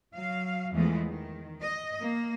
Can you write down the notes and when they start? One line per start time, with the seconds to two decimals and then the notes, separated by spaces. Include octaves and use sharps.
0.14 F#3 F5
0.72 E2 E3 F3 G#3 A3 B3
1.07 D#3
1.61 D#5
2.00 A#3